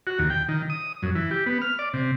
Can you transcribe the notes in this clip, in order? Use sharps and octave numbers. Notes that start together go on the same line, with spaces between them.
F#4
D#2
G5
D#3
D#6
F#2
E3
G4
B3
F6
D5
C3